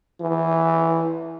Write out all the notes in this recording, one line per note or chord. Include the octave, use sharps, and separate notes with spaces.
E3